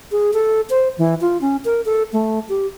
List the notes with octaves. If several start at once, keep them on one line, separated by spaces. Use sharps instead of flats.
G#4
A4
C5
E3
F4
C#4
A#4
A4
A3
G4